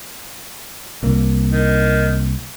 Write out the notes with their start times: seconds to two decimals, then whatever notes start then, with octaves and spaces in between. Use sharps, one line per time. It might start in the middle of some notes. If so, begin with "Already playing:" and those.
1.03 C2 A#3
1.52 D#3